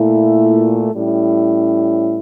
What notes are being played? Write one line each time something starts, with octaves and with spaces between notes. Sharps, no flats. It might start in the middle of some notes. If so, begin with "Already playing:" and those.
Already playing: A#2 A3 E4
A2 G3 C#4 E4